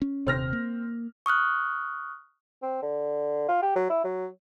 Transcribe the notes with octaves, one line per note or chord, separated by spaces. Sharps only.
C#4
D#1 C3 C4 F6 A#6
A#3
C#6 D#6 F6 F#6
C4
D3
F4
G4
F#3
E4
F#3